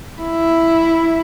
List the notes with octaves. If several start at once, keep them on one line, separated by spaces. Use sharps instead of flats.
E4